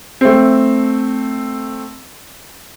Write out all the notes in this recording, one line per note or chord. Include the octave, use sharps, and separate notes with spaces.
A3 C4